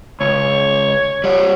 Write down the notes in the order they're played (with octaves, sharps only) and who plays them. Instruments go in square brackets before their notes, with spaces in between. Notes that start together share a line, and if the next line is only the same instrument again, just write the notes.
[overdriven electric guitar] C#2 [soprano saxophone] C#5
[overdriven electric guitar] G3 C#5